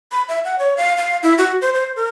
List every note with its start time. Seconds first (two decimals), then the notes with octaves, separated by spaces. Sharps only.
0.12 B5
0.29 E5
0.45 F#5
0.59 C#5
0.77 F5
0.97 F5
1.23 E4
1.38 F#4
1.62 C5
1.74 C5
1.96 A#4